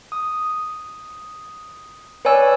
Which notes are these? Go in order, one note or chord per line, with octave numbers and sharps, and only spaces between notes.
D#6
B4 C#5 D5 G#5 E6